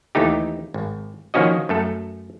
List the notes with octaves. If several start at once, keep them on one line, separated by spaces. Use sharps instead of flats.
D#2 E3 A3 D#4 G4
G#1
D#3 F3 A#3 C#4 F#4 D#5
F#2 A3 A4